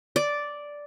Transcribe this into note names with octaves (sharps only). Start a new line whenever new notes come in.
D5